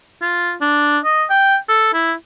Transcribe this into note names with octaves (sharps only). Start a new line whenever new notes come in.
F4
D4
D#5
G5
A4
E4